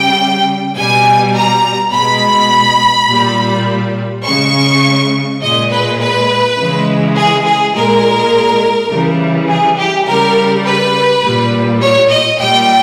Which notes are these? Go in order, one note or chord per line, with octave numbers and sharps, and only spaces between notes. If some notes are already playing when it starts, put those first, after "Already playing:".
Already playing: C#3 G3 G5
B2 G3 G#5
A#5
B2 G#3 B5
A#2 G3
C#3 G#3 C#6
A#2 G#3 D#5
B4
B4
C#3 E3 G#3
G#4
G#4
A#2 G#3 A#4
C#3 E3 G3
G#4
G4
C#3 G3 A#4
B4
A#2 G3
C#5
D#5
A#2 G3 G5